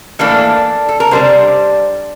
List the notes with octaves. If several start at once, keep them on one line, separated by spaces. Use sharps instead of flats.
A2 E3 A#3 D4 A4
A4
A#4
C3 G3 D4 C5